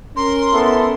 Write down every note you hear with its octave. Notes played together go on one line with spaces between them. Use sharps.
C#4 A#4 C6
B3 E4 A4